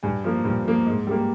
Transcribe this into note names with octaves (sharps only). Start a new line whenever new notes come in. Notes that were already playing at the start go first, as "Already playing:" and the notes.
G2 G#5
F3 A#3
G2
F3 A#3
G#2
G3 A#3